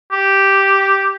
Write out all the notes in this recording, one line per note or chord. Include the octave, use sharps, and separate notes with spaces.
G4